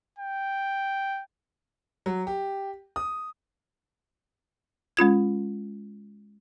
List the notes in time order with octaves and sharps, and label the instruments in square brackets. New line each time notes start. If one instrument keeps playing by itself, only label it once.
[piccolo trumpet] G5
[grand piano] F#3
G4
D#6
[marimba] G#3 C#4 F4 G#6